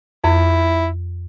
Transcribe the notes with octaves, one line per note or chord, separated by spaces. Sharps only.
F2 E4